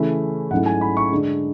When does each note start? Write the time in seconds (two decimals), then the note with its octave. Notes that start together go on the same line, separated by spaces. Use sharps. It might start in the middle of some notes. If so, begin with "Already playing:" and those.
Already playing: C#3 E3 A3 C#4 E4
0.51 G#2 F#3 A3 C#4 E4 F#5
0.66 G#5
0.81 B5
0.97 C#6
1.11 D3 G#3 D4